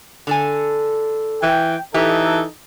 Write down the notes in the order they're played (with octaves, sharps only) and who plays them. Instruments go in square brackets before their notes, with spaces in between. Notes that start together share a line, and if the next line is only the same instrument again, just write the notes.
[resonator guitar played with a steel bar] D3 A4 G#5
[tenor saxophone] E3 [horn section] G5
[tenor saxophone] E3 [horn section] D#4 A4 [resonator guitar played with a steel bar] G4